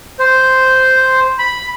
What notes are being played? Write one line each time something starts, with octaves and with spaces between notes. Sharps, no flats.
C5
B5